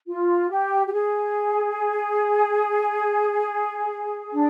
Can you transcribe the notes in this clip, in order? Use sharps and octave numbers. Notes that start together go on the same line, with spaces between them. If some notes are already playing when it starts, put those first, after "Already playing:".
F4
G4
G4
G#4
D4